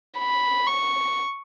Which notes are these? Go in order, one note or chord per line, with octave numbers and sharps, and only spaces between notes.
B5
C#6